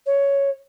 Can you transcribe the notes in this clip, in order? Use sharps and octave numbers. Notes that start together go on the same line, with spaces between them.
C#5